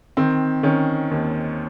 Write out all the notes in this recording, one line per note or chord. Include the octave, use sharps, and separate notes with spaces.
D#3 C4
D#3 C#4
D#2